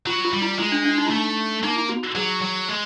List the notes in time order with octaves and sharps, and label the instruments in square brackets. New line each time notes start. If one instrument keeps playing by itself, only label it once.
[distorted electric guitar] F#3 [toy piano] F4
[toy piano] F4
[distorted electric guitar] G3
[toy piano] E4
[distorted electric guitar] G#3 [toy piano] E4
[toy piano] D4
D4
D#4
E4
[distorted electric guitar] A3 [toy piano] D#4
[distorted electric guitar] A#3 [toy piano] D#4
[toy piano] E4
F#4
F#4
[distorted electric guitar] F#3 [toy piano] G#4
[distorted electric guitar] F#3
G#3